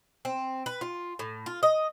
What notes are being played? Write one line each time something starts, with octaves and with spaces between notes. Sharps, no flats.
C4
B4
F4
A2
F4
D#5